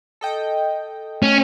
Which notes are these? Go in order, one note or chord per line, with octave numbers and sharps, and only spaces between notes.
A4 D#5 G5
A3 C#4